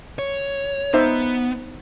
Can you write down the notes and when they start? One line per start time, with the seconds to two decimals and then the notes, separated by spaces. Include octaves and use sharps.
0.19 C#5
0.94 B3 D#4 C5 E5